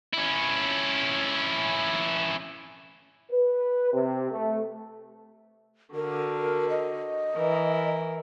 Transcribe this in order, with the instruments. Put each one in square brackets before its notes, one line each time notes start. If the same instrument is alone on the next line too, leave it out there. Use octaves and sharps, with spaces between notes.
[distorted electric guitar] C#4 E4
[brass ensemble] B4
C3
A3
[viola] D3 F#4 [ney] A#4
[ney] D#5
[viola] E3 A#4